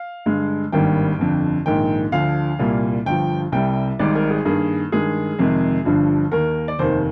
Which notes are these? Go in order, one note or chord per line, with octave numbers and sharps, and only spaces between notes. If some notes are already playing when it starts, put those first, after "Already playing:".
Already playing: F5
G2 D3 G#3
G#1 G2 D#3 G3 A#3 G5
G1 F2 D3
A#1 G#2 D#3 A#3 G5
D2 D3 F3 F5
C2 A#2 G3 A#3
G1 G2 F3 G5
C2 C3 G3 G5
G#1 G#2 G3 D5
A#4
G#4
G2 D#3 A#3 G#4
G2 D#3 G#3 G#4
F2 C3 D#3 G#3
G1 G2 D3 F3
D#2 D#3 A#3 A#4
D5
F1 D#2 D#3 C5